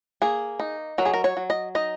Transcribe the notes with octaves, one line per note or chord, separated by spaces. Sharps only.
A#3 G#4
D#4
F#3 A#4
G#4
A#4
C#5
F#3
D#5
D#4 D#5